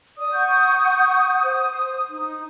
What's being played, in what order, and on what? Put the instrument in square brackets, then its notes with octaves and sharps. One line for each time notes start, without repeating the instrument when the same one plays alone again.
[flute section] D5 [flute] D#6
[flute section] F#5 C#6 G6
C5
D#4